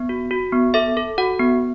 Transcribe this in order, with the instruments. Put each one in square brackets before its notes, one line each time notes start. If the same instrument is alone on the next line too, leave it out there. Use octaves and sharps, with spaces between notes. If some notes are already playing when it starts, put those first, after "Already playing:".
Already playing: [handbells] B3
F#4
F#4
B3
A4 E5
A4
F#4 F#5
B3